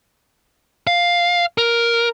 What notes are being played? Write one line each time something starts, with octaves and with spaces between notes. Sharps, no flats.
F5
A#4